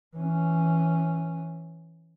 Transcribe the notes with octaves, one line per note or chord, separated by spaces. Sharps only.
E3 C#4